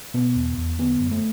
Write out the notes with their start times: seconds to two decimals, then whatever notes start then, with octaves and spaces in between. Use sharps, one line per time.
0.14 B2 B3
0.36 E2
0.57 E2
0.79 D3 B3
1.00 F#2
1.11 A3